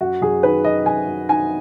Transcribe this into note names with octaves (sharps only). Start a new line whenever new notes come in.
F#2 F#4
F#2 G#4
D#3 B4
F#3 D#5
F#2 G#5
F#2
D#3 G#5